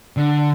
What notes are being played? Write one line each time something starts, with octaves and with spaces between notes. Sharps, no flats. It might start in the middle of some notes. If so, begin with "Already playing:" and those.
D3